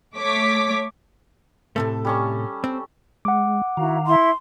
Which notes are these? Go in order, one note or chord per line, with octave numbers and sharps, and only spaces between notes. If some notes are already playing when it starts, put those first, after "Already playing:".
A3 C#5 D6 B6
A2 C3 A3 A4
G3 C#4 C#6
C4
G#3 F#5 D6
D#3 E4 F#4 F5 A#5
E4 E5 C6